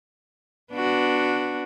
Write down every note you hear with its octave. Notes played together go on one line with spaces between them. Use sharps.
B3 D4 F#4